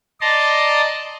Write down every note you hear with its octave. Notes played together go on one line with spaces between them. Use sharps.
D5 D#5 A5 A#5 C6